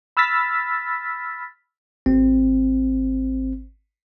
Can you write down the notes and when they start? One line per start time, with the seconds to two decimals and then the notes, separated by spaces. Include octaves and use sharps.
0.17 B5 E6 F6 A6 B6
2.06 G#1 C4